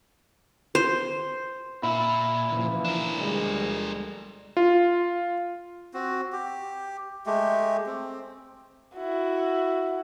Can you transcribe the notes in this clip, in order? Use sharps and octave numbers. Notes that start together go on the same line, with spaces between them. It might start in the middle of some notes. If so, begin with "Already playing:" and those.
C5
A#2 E4
F#1 E3 F3
D4 A#4
D2 G3 G#3
F4
C4 F#4
G4
G#3 A3 G4
C4
E4 F#4